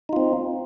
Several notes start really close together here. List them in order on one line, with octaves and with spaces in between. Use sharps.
D#4 F4 C4